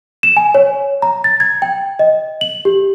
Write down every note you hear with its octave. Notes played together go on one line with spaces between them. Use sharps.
E7
G#5
C#5
A#5
A6
G#6
G5
D#5
F#7
G4